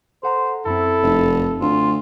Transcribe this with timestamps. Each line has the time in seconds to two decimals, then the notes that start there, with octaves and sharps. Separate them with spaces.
0.23 A4 C5 F#5 A#5
0.66 F#2 C4 E4 A4
1.03 F1
1.61 D2 F4